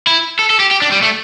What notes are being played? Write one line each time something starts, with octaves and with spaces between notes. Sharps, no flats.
E4
A4
A4
G4
G4
D4
G3
A3